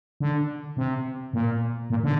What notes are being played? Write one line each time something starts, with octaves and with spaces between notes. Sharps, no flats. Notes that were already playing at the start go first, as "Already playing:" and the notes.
D3
C3
A#2
A#2
D3